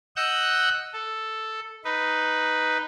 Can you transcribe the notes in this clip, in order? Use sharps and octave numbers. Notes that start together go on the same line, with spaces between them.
D#5 F#5 E6 F#6 G6
A4
D#4 B4